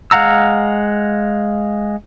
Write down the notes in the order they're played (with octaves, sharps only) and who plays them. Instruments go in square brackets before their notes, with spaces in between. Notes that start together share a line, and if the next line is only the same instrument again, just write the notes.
[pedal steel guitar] G#3 F5 F#5 A#5 E6